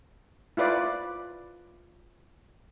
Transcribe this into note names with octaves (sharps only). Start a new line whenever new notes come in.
E4 F4 B4 D5